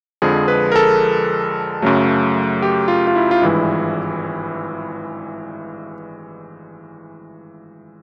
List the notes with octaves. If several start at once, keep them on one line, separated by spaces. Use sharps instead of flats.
F2 D3 F3 G#3 G#4
B4
A#4
A4
F#2 C#3 F#3 A3
G4
F4
F4
E4
F4
G#1 G2 E3 G#3 E4